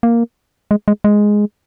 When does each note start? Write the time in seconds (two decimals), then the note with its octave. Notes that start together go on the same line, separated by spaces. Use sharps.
0.03 A#3
0.71 G#3
0.88 G#3
1.04 G#3